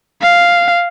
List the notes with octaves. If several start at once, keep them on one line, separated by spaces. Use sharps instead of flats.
F5